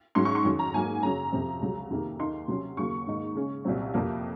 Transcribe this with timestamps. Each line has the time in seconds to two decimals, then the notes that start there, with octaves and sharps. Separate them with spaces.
0.15 G#2 F#3 C#4 C6
0.25 C#6
0.35 C6
0.44 F2 D#3 F#3 C#4
0.59 A#5
0.74 G#2 F#3 A#3 G#5
1.03 F#2 C#3 F#3 C#4 A#5
1.32 F2 C3 F3 C4
1.61 C#2 C3 F#3
1.90 F2 C3 D#3 A#3
2.19 D#2 D#3 A#3 D#4 C6
2.48 C3 F#3 C#4
2.77 D#2 C#3 F#3 A#3 C#6
3.07 G#2 D#3 A#3 D#4
3.35 C#3 G#3 C#4
3.65 C2 A#2 F#3 C4
3.94 F2 C3 F3 A#3